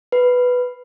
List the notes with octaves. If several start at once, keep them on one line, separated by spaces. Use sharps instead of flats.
B4